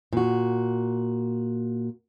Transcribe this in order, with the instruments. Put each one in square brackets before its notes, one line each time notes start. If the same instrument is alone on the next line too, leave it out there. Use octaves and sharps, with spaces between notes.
[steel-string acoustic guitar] A#2 F#4